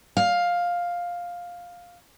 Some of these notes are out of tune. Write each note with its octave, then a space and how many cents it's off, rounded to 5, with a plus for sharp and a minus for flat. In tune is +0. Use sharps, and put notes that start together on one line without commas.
F5 +10